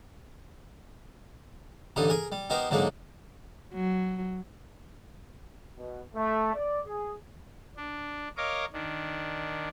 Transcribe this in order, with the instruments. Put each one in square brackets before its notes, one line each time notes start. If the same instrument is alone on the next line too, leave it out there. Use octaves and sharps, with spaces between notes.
[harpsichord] A1 G2 D3 G3 D#4 D#6
G#4 A#4 G#5 A#5
G3
B3 D#4 G4 A#4 C5
G#2 D3 F#3 G#3 A#3 D#4
[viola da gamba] F#3
[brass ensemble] B2
A3
D5
G#4
[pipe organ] D4
A#4 C#5 D#5 F5 D6
D#3 D4